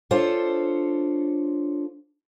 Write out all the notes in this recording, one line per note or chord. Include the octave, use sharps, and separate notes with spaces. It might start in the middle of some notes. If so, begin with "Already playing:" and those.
D4 F4 A4 C5 C#5